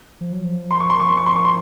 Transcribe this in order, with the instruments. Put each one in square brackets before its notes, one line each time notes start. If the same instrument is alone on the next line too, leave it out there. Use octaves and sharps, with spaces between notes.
[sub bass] F3
F#3
F3
[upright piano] C6
C#6
C6
[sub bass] F3 [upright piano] C#6
[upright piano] C6
C#6
C6
C#6
C6